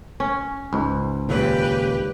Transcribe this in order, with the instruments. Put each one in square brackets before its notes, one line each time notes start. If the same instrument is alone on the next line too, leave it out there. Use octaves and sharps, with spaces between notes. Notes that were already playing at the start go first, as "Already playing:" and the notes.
[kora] C#4
[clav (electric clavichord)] C#2 G#2
[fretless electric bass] D#2 A#2 C#3 [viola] G4 B4